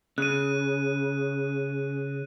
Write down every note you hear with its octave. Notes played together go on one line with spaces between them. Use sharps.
C#3 F#6 D#7